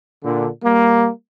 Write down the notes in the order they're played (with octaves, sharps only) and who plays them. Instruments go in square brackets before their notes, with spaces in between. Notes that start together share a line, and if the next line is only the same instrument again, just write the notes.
[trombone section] A#2 D3
G3 A#3